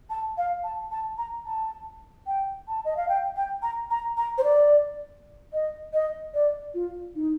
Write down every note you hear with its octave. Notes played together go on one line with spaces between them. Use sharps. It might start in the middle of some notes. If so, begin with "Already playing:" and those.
A5
F5
A5
A5
A#5
A5
G5
A5
D#5
F5
G5
G5
A#5
A#5
A#5
C5
D5
D#5
D#5
D5
F4
D#4